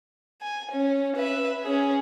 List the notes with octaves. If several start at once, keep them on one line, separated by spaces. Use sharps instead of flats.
G#5
C#4
B4 E5
C#4 G#4